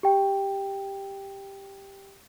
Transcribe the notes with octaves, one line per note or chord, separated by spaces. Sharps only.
G4 G5